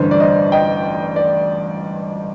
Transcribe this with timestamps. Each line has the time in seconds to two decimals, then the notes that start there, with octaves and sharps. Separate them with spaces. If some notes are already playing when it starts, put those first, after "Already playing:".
Already playing: A1 G2 D3 C5
0.11 D5
0.20 C5 D#5
0.52 D#5 G5
1.16 D5